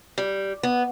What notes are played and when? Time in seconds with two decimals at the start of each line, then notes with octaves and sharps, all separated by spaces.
0.18 G3
0.63 B3